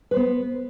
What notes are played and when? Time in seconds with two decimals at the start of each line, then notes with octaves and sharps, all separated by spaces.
0.11 B4
0.14 C5
0.16 B3